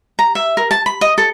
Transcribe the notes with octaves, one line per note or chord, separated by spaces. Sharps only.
A#5
E5
A#4
A5
B5
D#5
A4